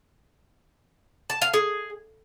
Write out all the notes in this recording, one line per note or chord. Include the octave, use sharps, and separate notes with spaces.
A5
F5
G#4